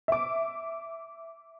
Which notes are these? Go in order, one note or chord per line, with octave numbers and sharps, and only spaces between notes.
E5 D6